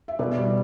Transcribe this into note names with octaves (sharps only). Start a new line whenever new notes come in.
E5
B2 B4 D5
G3